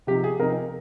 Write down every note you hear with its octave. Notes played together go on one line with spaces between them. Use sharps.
C3 F3 C4 D#4 G4
G#4
C3 F3 C4 D#4 A#4